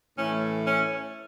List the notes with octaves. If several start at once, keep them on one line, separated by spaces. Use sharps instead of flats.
A2 E3 A3 C#4
C#4